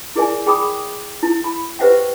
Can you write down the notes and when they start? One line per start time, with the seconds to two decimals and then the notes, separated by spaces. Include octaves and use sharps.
0.16 E4 G#4 A#4 D5 E5 G#5
0.46 G#4 G5 B5 D6 D#6
1.23 E4
1.44 B5
1.79 G4 B4 C5 E5 F#5 G5